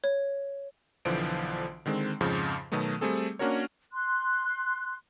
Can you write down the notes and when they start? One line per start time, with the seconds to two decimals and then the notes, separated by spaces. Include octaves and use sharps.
0.04 C#5
1.05 B1 D3 E3 F3 C5 D7
1.86 D3 D#3 G#3 C4
2.21 F2 G#2 C#3 F3
2.72 B2 D#3 F#3 A3 B3
3.01 G3 A3 C4 G#4 A4
3.39 A#3 C#4 D4 F#4 A#4 C#5
3.93 C6 F#6